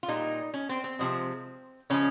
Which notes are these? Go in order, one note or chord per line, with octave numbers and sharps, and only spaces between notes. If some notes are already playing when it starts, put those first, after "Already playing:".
F4
A#2 G3 D#4
C#4
C4
C4
C3 F3 G#3
C#3 F3 G#3 C#4